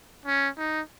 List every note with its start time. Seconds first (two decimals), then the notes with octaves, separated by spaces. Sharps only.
0.25 C#4
0.58 D#4